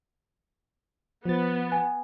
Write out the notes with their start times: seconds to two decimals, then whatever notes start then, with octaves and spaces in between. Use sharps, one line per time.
1.25 F3 B3 A6
1.72 G#5